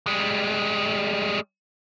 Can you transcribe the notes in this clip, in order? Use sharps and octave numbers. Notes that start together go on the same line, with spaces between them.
G3 G#3